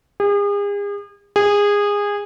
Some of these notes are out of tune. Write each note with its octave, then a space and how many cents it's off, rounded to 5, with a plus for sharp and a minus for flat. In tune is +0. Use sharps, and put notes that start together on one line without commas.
G#4 -40
G#4 -20